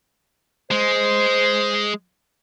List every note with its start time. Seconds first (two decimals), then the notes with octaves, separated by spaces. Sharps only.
0.71 G#3 C5